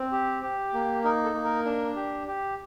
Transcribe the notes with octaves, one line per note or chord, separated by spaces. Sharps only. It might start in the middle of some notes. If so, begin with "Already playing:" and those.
Already playing: C4
G4
G4
A#3
D#4 A#4
A4
A#3
A#4
D4
G4
G4